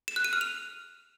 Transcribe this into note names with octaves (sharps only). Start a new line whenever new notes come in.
E7
F#6
D#7
F6
F7